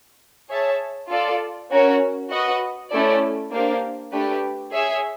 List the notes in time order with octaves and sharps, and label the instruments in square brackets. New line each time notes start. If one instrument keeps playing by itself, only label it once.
[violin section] G#4 C#5 E5 A5
F4 A4 D5
C#4 F#4 A#4 C#5
F#4 B4 D#5 F#5
A3 C#4 E4 A4 D5
A#3 D4 G4 C5 F5
A3 D4 G4 B4
G#4 C#5 E5